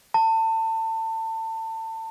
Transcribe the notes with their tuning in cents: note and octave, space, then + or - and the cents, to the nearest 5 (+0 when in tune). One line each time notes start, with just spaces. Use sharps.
A5 +30